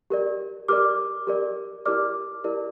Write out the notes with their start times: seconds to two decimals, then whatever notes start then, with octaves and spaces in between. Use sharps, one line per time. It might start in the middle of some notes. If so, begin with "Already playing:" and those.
0.10 G4 A#4 D5
0.68 G4 A#4 D5 D6 F6
1.27 G4 A#4 D5
1.86 E4 G4 A#4 D5 D6 F6
2.44 E4 G4 A#4 D5